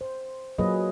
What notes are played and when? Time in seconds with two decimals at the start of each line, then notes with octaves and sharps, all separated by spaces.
0.01 C5
0.58 F#3 A#3 F4 G#4 B4 D#5